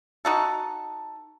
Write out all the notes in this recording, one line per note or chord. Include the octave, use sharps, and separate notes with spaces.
D#4 F#4 A4